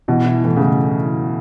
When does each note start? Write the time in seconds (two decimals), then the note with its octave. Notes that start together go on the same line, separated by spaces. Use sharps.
0.08 B2 E3
0.26 E4
0.44 A2 E3
0.56 C#3 A3